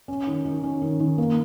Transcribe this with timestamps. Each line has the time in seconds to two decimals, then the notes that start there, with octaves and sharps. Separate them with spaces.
0.08 C#4
0.27 D#3
0.45 D#3
0.64 C#4
0.82 D#3
1.00 D#3
1.18 A#3